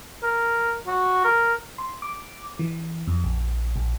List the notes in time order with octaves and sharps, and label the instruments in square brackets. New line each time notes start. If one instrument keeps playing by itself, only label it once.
[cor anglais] A#4
F#4
A#4
[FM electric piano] C6
D6
E3
F2
A#1
A#1